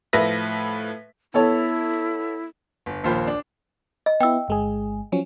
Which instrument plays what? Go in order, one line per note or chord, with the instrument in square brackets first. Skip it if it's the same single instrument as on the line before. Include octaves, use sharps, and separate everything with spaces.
[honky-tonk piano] A2 F3 B4 E5 A#6 B6
[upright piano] B3 A4 C#5 [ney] E4
[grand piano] G1
A#1 D#2 A#3 F4 C5 B5
D4
[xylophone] D#5
[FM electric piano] B3 E4 [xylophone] G5 E6
[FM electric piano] G1 G#3 G#4
F3 F#3 C#4